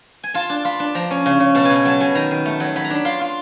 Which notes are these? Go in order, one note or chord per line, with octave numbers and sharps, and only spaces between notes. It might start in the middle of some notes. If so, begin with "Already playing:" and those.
G#5
F4 A5
D4
F4 B5
D4
F3 A#5
C#4
C#3
C#3
B2 A5
G#5
B2
G#5
F#3 A5
B2 G#5
D#3 A#5
D#3
A3
F#3
F#3 B5
A#5
D4 B5
F4 C6
F4